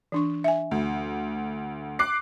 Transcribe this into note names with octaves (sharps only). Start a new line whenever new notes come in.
E3 D4 C#6
E5 G#5
D2
D6 F#6 C7